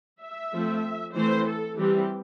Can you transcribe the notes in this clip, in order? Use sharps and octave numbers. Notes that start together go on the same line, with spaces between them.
E5
F3 A3 C4
E3 A3 C4 C5
A4
E3 G3 C4 G4